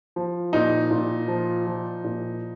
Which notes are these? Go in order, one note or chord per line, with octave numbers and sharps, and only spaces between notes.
F3
A#2 D#4
A#2
F3
F3
A#2